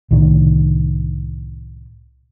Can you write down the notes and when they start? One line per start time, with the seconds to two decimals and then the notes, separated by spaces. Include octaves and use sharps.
0.11 C2 A2 D3 D#3